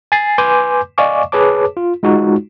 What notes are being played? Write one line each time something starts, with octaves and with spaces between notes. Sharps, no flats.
G#5 A6 C7
B4 G#5 C6 D6 G6
D5 D#5 F5 G#5 C#6 D6
G#4 B4 C#5 A5 D6
F4
G#3 D#4 F4 F#4